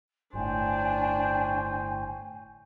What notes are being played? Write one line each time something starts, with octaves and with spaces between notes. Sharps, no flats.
G1 A2 D4 C5 C#5 G5 G#5